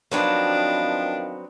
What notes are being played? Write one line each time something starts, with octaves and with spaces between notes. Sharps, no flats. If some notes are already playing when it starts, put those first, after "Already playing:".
D#3 F3 F#3 B3 C4 D4